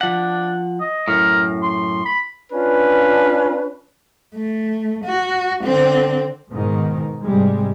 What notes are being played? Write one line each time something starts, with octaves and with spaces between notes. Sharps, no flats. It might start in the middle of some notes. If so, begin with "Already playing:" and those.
F3 D4 F#5
D#5
F#2 A2 A#4
C6
B5
C#4 D4 F4 B4
A3
F#4
D3 C4
G#2 B2 D#3
G#2 C3 G3 G#3